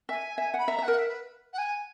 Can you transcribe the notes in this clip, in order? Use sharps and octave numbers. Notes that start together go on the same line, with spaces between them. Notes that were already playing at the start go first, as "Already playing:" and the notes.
E5 G#5
E5 G#5
F#5 B5
E5 A#5
E5
F#5
A#4
E5
B4
F#5
G#5